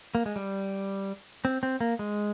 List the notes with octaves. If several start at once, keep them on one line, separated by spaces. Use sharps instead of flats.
A#3
G#3
G3
C4
C4
A#3
G#3